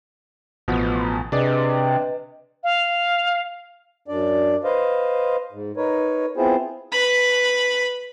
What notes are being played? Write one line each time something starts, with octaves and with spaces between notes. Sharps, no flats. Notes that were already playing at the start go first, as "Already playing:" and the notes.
A1 B2 F3 B3
C3 D4 G#4 B4 D5 D#5
F5
F#2 D4 D5
B4 C5 D#5 F5
G#2
D#4 A#4 B4 C#5
B3 C4 E4 F4 G#4 C5
B4 B5